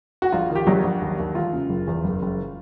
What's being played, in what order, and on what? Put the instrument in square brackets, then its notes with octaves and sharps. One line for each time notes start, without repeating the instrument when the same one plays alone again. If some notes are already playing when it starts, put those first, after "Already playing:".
[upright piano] F#4
A#1 F4
D#3
G4
A#1 F#3 F#4
A#1
D#2
D#2
E1 F4
C#3
F#1
E2
F#1
F#1